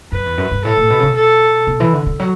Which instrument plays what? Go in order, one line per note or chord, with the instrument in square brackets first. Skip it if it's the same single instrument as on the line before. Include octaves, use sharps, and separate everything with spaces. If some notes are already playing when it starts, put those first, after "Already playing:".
[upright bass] F#2 [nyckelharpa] B4
[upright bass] E2
F#2
G2
[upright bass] A2 [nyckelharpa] A4
[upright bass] A2
B2
C#3
B2
[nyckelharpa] A4
[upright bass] B2
E3
D3
D3
F#3